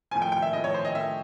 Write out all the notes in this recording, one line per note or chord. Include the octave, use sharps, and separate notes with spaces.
A2 F3 G#5
G5
G5
E5
A2 F3 D#5
C#5
C5
D#5
A2 F3 E5